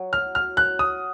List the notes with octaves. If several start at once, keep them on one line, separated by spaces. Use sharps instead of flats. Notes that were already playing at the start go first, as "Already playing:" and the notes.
Already playing: F#3
F6
F6
F#6
D#6